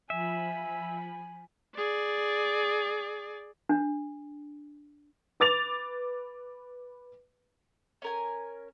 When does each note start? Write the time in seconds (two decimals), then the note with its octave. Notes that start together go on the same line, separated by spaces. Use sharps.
0.10 F3 E5 G#5 B5
1.76 G#4 D5
3.69 D4
5.40 B4 D6 A6 F7
8.02 C#4 A#4 G#5